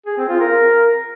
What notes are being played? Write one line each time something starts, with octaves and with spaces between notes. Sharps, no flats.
G#4
C4
F4
A#4